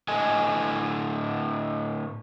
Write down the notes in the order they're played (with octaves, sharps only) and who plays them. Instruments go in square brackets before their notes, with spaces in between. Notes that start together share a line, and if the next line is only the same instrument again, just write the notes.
[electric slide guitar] A2 D3 A4 D#5 G#5